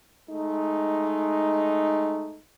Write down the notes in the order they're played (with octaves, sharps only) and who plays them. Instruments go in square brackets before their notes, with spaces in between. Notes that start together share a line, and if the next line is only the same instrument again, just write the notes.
[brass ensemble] G#3 A3 D#4